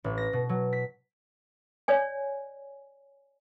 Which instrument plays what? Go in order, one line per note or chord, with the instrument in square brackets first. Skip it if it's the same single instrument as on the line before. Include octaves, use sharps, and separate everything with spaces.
[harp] A1
A#6
B2
F#3
B6
[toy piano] C#5 D5 G#5